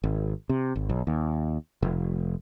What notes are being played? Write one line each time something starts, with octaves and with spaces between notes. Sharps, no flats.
G#1
C3
G#1
B1
D#2
F1